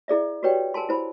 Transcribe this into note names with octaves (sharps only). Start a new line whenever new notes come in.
E4 G#4 D5 E5
F#4 G4 B4 C#5 D5 G5
A#4 G#5 A5 C6
E4 C5 B5